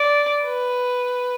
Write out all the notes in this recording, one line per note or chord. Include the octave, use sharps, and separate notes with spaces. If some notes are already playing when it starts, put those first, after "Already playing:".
Already playing: D5
B4